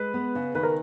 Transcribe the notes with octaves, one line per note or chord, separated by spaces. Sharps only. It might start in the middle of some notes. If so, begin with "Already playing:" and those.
Already playing: G#3 B4
B3
C#3
D#3 B4
A#4